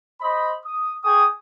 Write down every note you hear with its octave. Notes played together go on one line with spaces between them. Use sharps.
C5 D#5 B5
D#6
G#4 G5 C#6 D#6